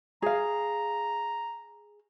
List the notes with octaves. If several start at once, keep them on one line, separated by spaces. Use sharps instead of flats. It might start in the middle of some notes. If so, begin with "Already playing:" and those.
G#4 F5 A#5